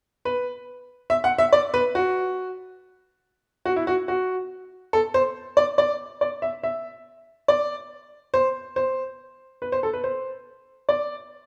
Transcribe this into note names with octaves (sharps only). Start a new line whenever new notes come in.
B4
E5
F#5
E5
D5
B4
F#4
F#4
E4
F#4
F#4
A4
C5
D5
D5
D5
E5
E5
D5
C5
C5
B4
C5
A4
B4
C5
D5